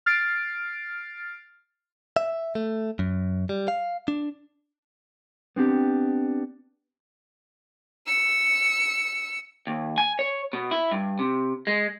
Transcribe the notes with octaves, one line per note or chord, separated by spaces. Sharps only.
F6 A6 C7 D7
E5
A3
F#2
G3
F5
D4
B3 C4 D4 G4
E6 C#7
D#2
G#5
C#5
B2
E4
G2
C3
G#3